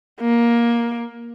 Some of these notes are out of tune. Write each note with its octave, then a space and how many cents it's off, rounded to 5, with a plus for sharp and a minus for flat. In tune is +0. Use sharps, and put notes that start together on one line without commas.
A#3 +15